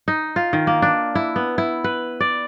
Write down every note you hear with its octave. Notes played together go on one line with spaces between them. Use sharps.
D#4
F4
D#3
A#3
D4
E4
B3
E4
B4
D5